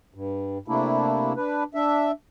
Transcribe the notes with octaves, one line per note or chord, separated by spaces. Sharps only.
G2
C3 A3 A#3 D4 E4
D4 B4
D4 E5